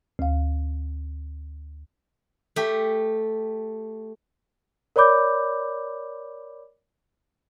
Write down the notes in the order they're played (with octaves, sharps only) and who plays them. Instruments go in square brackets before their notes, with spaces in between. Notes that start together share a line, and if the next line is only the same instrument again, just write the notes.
[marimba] D2 F5
[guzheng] A3 G4
[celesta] A#4 C#5 D5 B5 D6 G6